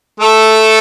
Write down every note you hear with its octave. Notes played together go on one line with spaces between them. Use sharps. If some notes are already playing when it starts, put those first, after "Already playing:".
A3 A4